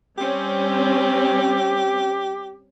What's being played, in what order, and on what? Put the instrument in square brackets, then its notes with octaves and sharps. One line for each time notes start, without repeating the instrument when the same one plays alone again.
[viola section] G3 C4 C#4 [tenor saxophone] G4